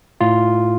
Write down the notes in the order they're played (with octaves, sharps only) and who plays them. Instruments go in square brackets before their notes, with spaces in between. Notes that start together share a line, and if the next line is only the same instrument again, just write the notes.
[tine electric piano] A2 F4